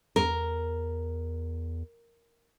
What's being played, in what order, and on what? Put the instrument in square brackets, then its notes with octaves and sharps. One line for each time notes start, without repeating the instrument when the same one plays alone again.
[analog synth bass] E2 [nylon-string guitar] A#4